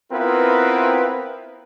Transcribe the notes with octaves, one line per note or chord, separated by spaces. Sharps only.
B3 C4 E4 F4 A#4 B4